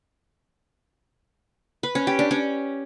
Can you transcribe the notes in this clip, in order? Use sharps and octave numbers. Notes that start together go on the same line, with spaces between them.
B4
C#4
G4
D4
C#4